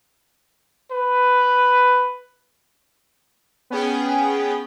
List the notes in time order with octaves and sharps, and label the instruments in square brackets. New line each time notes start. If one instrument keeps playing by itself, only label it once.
[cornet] B4
[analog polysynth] B3 C#4 G#4 G5